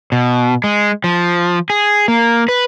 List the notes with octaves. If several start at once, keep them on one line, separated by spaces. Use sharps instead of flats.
B2
G#3
F3
G#4
A#3
B4